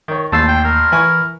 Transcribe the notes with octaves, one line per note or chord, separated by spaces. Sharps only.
D#3 C#5
A1 D#2 A5 E6 C7
G5
A#4
E3 E4 G#5 C#6